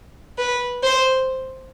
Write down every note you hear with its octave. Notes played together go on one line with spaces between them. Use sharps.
B4
C5